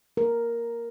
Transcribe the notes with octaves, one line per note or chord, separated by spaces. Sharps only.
A#4